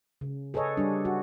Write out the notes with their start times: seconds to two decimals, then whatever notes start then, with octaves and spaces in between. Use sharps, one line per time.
0.21 C#3
0.54 G#4 A4 B4 C#5 D#5
0.77 G3 D4
1.05 F#4